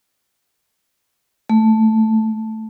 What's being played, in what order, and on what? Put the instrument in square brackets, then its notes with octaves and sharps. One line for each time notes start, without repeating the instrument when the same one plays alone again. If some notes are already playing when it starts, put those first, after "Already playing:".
[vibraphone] A3